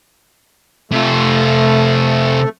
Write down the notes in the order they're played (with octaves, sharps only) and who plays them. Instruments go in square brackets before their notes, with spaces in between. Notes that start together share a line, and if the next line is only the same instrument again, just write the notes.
[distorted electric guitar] C3 F4 [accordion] A3